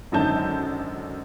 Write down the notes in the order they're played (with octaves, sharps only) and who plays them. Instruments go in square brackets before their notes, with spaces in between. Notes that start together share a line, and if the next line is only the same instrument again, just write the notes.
[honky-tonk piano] G#1 F#2 D3 D#4 A5 G6